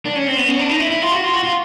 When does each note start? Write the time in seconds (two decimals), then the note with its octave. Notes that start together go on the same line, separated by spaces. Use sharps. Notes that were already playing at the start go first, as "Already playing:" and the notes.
0.06 D4
0.16 C#4
0.27 C4
0.37 B3
0.48 C#4
0.59 D4
0.69 D#4
0.80 E4
0.90 E4
1.02 F4
1.12 F#4
1.23 F4
1.33 F#4
1.44 F4